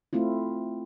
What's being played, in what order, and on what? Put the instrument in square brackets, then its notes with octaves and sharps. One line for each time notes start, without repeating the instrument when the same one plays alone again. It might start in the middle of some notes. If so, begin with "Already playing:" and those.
[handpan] A3 C4 E4 F4